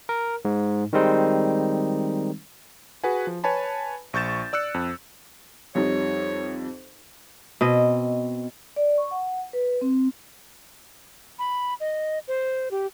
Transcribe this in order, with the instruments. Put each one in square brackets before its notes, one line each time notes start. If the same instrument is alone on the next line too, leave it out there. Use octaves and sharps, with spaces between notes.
[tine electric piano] A#4
G#2
D#3 G3 G#3 C4 D#4
[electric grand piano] F#4 G#4 B4 F#5 G#5
F3
B4 C#5 G#5 A5 B5
A#1 C#6 G6 A6 E7
D5 E6 F#6 C#7
F2
[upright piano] F2 G3 D#4 [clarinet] C#5
[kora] B2 C4 D#5
[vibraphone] D5
C#6
F#5
B4
C4
[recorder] B5
D#5
C5
G4